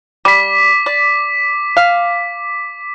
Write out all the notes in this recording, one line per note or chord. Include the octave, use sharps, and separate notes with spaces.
G3 D6 B6
D5
F5